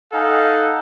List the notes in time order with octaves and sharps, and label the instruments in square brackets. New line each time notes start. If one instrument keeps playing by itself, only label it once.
[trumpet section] D#4 A4 F5 F#5 G#5